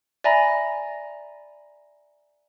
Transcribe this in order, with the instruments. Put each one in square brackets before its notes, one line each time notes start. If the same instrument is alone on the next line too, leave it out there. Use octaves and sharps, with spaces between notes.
[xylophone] D5 E5 G#5 A#5 B5 A#6